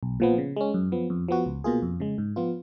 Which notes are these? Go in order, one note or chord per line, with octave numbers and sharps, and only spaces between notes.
B1
A#2 F3 B3
C#3
G#3 C#4
F#2
F3 B3
F2
F3 B3 F#4
C#2
B2 A#3 F4 G#4
F2
C#3 G#3
G#2
F3 B3 F4